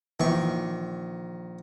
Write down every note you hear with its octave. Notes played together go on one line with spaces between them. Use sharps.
A#1 D#3 E3 C#6